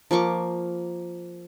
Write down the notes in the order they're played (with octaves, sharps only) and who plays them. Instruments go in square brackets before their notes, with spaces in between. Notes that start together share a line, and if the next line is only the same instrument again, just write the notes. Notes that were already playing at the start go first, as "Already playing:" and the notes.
[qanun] F3 A#3 C#6 D6